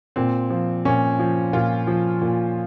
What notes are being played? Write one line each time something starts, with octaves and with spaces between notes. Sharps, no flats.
A#2 C4
F3
A#2 C#4
F3
A#2 F4
F3
A#2